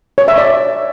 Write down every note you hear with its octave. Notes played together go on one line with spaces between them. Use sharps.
C#5
E5
D5